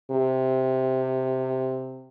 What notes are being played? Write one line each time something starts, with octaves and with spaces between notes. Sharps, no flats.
C3